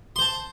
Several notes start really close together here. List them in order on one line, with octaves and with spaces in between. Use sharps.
C6 C5 A5